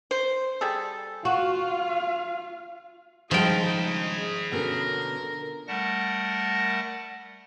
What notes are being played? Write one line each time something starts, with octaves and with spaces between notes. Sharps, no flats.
C5
G3 G#4 A4
F4 F#4 F5
C#3 F3 G3 G#3 D#4 G#4 G5 B5
B2 D3 C#4 A#4
G3 A3 A#4 F#5 A5 A#6